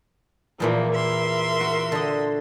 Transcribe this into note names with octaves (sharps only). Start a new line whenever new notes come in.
E2 A#2 E3 F3 A#3
A#4 E5 C6
F#4
D3 D#5